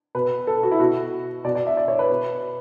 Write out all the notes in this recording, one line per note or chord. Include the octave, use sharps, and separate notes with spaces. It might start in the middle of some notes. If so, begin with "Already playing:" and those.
B2 B4
A4
F#4
E4
B2 F#4
B2 D5
D5
E5
D5
C#5
B4
B2